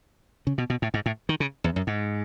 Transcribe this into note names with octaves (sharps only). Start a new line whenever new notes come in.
C#3
B2
B2
A2
G#2
A2
D#3
C#3
E2
F#2
G#2